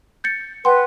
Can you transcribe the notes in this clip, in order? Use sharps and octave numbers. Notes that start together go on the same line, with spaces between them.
G6 A6 C#7
B4 F#5 G5 C6